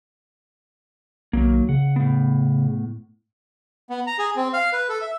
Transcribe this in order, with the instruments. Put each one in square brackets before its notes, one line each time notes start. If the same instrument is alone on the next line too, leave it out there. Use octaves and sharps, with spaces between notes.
[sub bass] B1 [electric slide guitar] D#3 F#3 A#3
[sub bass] C#3 [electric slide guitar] F#5
[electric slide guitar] A2 B3
[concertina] B3
A#5
G#4
C4
F5
B4
A4
E5